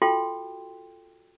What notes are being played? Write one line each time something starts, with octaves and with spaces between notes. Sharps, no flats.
F4 F#4 A4 G5 C6